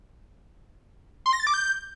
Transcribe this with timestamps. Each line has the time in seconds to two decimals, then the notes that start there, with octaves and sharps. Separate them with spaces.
1.26 C6
1.33 A#6
1.40 A6
1.47 D6
1.54 G6